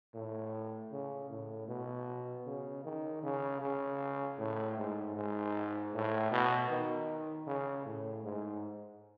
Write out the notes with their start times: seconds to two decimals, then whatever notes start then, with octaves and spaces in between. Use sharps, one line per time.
0.14 A2
0.92 C#3
1.30 A2
1.68 B2
2.46 C#3
2.85 D#3
3.23 C#3
3.62 C#3
4.39 A2
4.77 G#2
5.16 G#2
5.94 A2
6.32 B2
6.70 D#3
7.47 C#3
7.86 A2
8.24 G#2